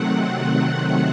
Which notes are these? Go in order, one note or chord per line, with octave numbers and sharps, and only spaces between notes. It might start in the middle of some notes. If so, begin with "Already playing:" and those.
Already playing: C3 D#3 F#3 A3 C4 F#5